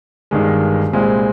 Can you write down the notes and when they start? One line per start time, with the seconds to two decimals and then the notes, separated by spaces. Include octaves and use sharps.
0.31 G1 G2 D#3 G#3
0.93 C2 A#2 G#3 C4